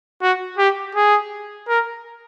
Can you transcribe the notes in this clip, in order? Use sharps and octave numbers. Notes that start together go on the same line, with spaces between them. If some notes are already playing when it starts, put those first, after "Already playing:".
F#4
G4
G#4
A#4